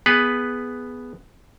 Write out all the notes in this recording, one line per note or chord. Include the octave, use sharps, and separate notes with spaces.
B3 G#4 B4